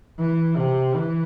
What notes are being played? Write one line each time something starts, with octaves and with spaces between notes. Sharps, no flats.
E3
C3
E3